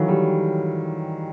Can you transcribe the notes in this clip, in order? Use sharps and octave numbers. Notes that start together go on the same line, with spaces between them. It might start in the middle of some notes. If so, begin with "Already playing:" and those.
Already playing: D#3 E3 F#3 A4 C#5 F5
G3